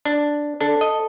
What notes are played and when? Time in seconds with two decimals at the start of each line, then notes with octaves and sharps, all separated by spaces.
0.05 D4
0.61 D4 A4
0.81 D#5